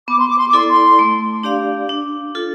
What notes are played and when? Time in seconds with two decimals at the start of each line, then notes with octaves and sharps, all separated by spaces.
0.08 B3 D6
0.18 C6
0.28 D6
0.38 C6
0.48 D6
0.53 E4 A4 D5 C6
0.68 C6
0.99 A3
1.43 D4 G4 D5 F5
1.89 D4
2.35 F4 A4